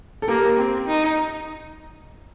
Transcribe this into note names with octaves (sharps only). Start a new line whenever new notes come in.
A4
A#3 G4 A#4
C4
D#4